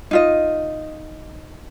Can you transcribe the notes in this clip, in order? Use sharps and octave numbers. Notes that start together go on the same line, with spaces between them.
D#4 F4 D#5